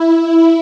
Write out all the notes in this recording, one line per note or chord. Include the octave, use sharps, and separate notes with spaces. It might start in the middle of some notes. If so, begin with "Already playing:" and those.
Already playing: E4